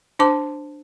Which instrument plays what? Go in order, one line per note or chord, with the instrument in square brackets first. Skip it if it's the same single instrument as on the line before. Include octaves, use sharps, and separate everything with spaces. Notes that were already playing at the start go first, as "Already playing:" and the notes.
[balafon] D4 C5 A5 D6